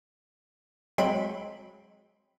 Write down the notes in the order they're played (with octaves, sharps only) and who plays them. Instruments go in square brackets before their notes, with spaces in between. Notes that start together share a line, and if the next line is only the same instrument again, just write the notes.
[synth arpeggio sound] F#3 G#3 C4 B5 C6 D7